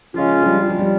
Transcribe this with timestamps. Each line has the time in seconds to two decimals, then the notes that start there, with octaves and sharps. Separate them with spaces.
0.14 C#3 F3 G#3 C#4 F4
0.42 F3
0.46 G3
0.69 F3
0.79 G3